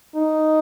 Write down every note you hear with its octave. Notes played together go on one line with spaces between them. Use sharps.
D#4